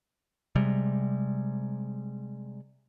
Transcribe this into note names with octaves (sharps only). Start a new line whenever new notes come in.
C3 G3 G#3